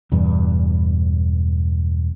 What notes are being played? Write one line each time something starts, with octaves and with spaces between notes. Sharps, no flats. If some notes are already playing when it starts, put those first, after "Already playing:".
E1 E2 G2